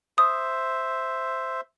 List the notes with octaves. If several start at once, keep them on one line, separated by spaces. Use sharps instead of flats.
C5 E5 D#6